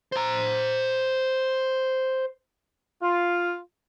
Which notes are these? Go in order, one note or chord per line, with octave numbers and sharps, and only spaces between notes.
C5 A#5
F4